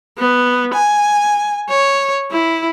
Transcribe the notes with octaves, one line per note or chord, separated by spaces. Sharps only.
B3
G#5
C#5
E4